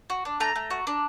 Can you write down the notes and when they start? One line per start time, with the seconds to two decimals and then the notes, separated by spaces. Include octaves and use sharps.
0.10 F#4
0.25 D4
0.40 A3 A#5
0.56 A3
0.70 F#4
0.87 D4